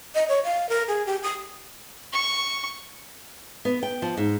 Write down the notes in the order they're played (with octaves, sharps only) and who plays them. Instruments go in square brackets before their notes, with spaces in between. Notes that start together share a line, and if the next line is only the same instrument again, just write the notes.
[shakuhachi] D#5
C#5
F5
A#4
G#4
G4
D#6
[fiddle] C#6
[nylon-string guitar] B3
G5
F3
G#2